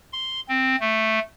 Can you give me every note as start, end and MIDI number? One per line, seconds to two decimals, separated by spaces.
0.13 0.40 84
0.49 0.76 60
0.80 1.19 57